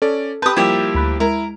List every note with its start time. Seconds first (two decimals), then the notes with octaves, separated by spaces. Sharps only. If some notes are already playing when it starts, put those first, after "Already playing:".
0.02 C#4 A4 D5
0.42 G4 B4 A5 D#6 G6
0.56 F3 G3 A#3 E4 G4 E5
0.95 D2 B5 F#6
1.20 G#3 E4 A#4